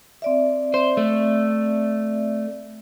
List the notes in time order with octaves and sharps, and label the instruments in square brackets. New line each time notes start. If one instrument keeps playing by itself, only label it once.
[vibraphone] C4 D5 E5
[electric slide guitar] C5
A3